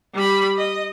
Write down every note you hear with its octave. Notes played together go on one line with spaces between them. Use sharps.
G3 B5
D#5